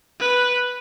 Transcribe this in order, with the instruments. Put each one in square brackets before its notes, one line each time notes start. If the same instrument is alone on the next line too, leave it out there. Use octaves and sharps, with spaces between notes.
[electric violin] B4